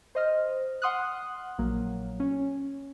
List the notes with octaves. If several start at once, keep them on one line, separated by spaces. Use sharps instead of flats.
C5 D#5 F6
F#5 C6 D#6 F6 F#6
A#1 F#3 A#3
C#4